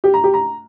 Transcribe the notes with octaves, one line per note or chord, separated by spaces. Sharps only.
G4
A#5
G4
A#5